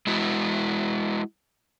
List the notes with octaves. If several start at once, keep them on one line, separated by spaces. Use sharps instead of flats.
G#3 E4 F#4